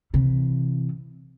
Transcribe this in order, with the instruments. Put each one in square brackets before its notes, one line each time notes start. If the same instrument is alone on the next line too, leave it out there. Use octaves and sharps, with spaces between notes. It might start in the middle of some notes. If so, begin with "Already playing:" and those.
[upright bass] C3 E3